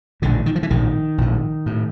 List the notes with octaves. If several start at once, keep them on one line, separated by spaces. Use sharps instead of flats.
A#1 A2 D3
D#3
F3
E3
A#1 A2 D#3
A#1 A2
A2